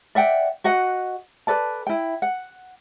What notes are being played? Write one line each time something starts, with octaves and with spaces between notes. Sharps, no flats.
D5 E5 F#5 G5
F#4 D#5 F#5
A4 B4 D5 A5
E4 G5
F#5